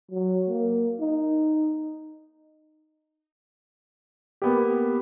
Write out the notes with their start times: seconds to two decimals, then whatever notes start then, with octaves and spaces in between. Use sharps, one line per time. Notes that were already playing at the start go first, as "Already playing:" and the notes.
0.11 F#3
0.49 A#3
1.00 D#4
4.42 A#3 B3 G4